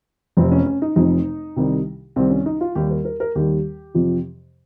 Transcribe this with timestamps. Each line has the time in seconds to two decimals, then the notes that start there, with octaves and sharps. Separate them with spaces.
0.37 F1 F2 C3 C4
0.52 C#4
0.66 C#4
0.82 D#4
0.96 F1 F2 C3 D#4
1.56 C2 C3 D#3 G3
2.16 C2 C3 D#3 G3 C4
2.30 C#4
2.46 D#4
2.61 F4
2.75 D#2 D#3 G3 G4
2.90 A#4
3.05 A#4
3.20 A#4
3.35 D#2 D#3 G3 G4
3.94 F2 C3 F3